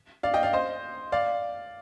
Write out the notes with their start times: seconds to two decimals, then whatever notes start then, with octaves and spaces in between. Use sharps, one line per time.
0.23 D5 F5
0.34 D#5 G5
0.43 D5 F5
0.53 C5 D#5
1.12 D5 F5